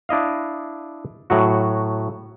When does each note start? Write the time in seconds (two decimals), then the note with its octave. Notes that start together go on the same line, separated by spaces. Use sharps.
0.09 D4 E4 D#5 F5
1.30 A2 F#3 F#4